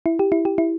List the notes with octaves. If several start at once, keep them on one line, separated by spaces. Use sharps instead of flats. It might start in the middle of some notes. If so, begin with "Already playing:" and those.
E4
G4
E4
G4
E4